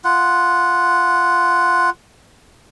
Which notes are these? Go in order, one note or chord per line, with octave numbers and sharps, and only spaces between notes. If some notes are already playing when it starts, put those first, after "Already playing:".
F4 F#5